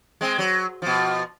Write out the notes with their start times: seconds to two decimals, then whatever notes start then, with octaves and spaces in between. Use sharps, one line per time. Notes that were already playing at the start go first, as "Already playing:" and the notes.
0.21 G#3 C4
0.39 F#3
0.82 B2 F3